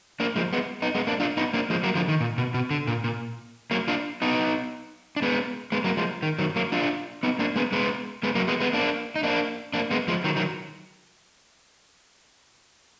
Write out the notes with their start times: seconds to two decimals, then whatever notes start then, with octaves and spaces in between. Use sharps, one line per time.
0.20 A#3 D4
0.36 F3 G#3
0.53 G#3 B3
0.82 B3 D#4
0.95 G#3 B3
1.07 A#3 D4
1.20 D4 F4
1.37 B3 D#4
1.54 A#3 D4
1.70 F3 G#3
1.83 F#3 A#3
1.95 D3 F3
2.08 D#3
2.20 A#2
2.38 B2
2.54 B2
2.71 D3
2.87 A#2
3.04 A#2
3.71 F#3 A#3
3.88 D4 F4
4.22 B3 D#4
5.16 D4
5.22 G#3 B3
5.72 G#3 B3
5.84 F#3 A#3
5.97 F3 G#3
6.23 D#3
6.38 D#3 F#3
6.56 F#3 A#3
6.72 D4 F4
7.23 B3 D#4
7.39 A#3 D4
7.56 G#3 B3
7.72 G#3 B3
8.23 G#3 B3
8.35 F#3 A#3
8.48 G#3 B3
8.60 G#3 B3
8.73 A#3 D4
9.16 D#4
9.23 A#3 D4
9.73 A#3 D4
9.91 G#3 B3
10.08 F3 G#3
10.24 D#3 F#3
10.36 D#3 F#3